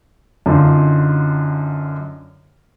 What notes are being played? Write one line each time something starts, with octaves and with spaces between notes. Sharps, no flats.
F#2 D3 D#4 F4